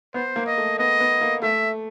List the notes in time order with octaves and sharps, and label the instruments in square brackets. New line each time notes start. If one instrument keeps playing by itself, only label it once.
[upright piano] B3 [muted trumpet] C5
[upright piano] A#3
[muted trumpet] D#5
[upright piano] A3
[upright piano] B3 [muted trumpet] D#5
[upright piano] B3
A#3
[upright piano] A3 [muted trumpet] E5